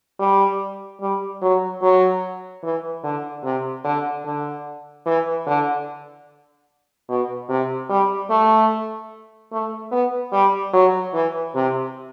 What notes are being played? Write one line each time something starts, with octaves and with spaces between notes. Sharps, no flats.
G3
G3
F#3
F#3
E3
D3
C3
D3
D3
E3
D3
B2
C3
G3
A3
A3
B3
G3
F#3
E3
C3